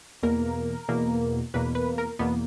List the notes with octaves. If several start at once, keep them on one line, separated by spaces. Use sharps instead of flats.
E2 B2 A#3 A#4
E2 B2 A#3
E2 B2 A#3 B4
B4
A#4
E2 B2 A#3 B3